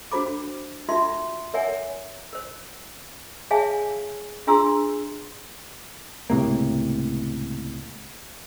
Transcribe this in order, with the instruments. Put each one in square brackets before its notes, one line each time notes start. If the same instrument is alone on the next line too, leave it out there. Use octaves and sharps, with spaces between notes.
[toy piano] D4 F#4 C5 B5 D6
D#4 F4 F#4 E5 C6
A#4 C#5 E5 F#5 G#5
A#4 C5
G#4 C#5 E5 F5 G#5 A5
D4 F4 G#4 A#5 C6 E6
[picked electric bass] C#2 A2 C3 A#3